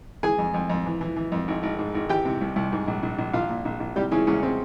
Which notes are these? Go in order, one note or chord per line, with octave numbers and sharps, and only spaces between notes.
E3 G#4 G#5
F2
F2
F2
E3
E3
E3
F2
G#1
G#1
G#2
G#1
E3 G4 G5
C3
C2
C2
G#2
A#1
A#1
A#1
A#1 F4 F5
A#2
A#1
A#1
C3 G3 G4
C#3 E3 C#4
E2 C#3 C#4
C4